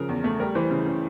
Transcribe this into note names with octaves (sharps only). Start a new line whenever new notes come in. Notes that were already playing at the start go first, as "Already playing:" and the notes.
Already playing: C#3 F3 A#4
E2
A3
G3 A#4
E3 C5
C#3
C#3